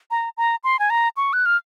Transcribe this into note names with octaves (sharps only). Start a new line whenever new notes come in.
A#5
A#5
C6
G#5
A#5
C#6
F#6
F6